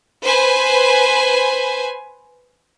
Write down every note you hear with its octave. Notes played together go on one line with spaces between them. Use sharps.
B4 C5 G#5